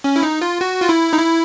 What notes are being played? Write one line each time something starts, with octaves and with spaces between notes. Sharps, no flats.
C#4
E4
D#4
F4
F#4
F4
E4
D#4
E4